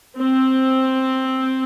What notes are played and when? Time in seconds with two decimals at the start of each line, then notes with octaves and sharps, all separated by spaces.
0.18 C4